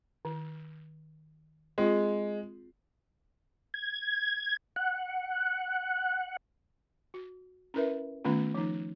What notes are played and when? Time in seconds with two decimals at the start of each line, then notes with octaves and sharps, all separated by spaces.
0.25 D#3
1.78 G#3 C4 F4 G#4
3.74 G#6
4.76 F#5
7.14 F#4
7.74 C#4 E4 A#4 B4 E5
8.24 D#3 A3 B3 C#4 F4
8.55 F3 D#4